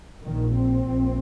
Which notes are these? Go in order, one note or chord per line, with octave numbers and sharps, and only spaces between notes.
A#1 A#2 D#3
C4
A#1